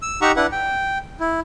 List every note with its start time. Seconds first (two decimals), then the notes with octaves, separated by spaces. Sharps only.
0.02 E6
0.21 D#4 G4 F#5 A#5 C#6 E6
0.36 D4 E4 B4 F#5
0.52 G5
1.20 E4